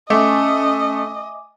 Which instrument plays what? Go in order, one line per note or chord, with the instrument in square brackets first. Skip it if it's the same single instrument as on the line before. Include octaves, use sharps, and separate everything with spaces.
[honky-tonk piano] A3 [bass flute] C#4 [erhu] D#5 [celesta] E5 G#5 D6